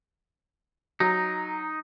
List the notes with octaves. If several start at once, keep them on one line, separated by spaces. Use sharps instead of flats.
F#3 D#4